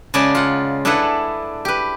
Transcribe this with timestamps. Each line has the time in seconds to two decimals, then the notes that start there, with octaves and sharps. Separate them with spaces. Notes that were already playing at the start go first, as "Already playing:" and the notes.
0.14 C#3 G#3 D5 G#5 A5
0.35 F4 F#5
0.85 D4 E4 G#4 A4 B4 F#5
1.65 G4 B4